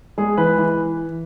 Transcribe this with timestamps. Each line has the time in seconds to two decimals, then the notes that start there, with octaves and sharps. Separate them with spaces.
0.18 G#3 G#4
0.37 E3 B4
0.58 E3